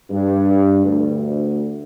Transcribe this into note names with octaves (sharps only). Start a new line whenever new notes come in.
G2
D2